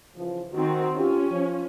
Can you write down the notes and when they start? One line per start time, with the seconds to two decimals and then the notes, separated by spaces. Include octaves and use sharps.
0.15 C#3 E3 F3
0.53 D#3 C4 F#4
0.96 C#4 F4 G4
1.31 F3